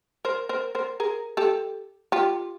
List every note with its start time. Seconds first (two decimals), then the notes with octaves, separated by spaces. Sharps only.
0.25 A#4 C5
0.49 A#4 C5
0.75 A#4 C5
1.00 G#4 A#4
1.37 G4 A4
2.12 F4 G4